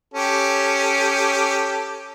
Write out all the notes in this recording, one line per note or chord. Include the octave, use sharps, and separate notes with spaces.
C#4 G4 A4